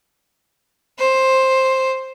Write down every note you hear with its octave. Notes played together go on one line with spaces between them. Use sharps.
C5